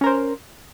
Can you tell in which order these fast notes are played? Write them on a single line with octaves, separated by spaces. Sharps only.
C#4 A#4 C5